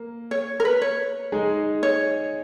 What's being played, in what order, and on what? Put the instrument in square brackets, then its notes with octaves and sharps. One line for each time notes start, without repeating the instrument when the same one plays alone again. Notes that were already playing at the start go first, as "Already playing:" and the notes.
Already playing: [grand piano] A#3
[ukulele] C#5
A#4
B4
C#5
[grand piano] G#3 D#4 G#4
[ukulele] C#5